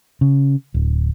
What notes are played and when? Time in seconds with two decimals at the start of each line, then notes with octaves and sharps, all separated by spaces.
0.21 C#3
0.74 D1